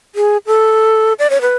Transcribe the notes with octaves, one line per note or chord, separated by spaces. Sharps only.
G#4
A4
D5
C#5
B4